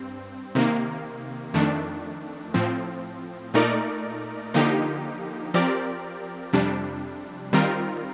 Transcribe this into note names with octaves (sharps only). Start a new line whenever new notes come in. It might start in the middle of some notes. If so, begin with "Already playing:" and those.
Already playing: G2 C4
C3 D#3 A#3
F2 D#3 A3 D4
A2 F3 C4
A#2 A3 D#4 A#4 D5
D3 F3 A#3 D#4 G4
F3 C4 G4 A#4 D5
F2 C3 G3 D4
D#3 G3 C4 F4 A#4